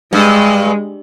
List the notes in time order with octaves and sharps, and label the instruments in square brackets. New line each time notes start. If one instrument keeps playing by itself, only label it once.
[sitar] G2 [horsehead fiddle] G#3